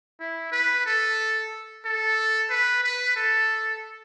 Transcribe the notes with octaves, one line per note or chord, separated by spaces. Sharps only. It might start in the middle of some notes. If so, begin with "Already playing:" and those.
E4
B4
A4
A4
B4
B4
A4